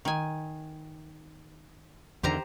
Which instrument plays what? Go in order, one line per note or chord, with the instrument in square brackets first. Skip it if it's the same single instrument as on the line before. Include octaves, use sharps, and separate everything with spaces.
[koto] D#3 G#5
[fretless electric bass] E2 D3 D#3 [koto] G4 C5 A#5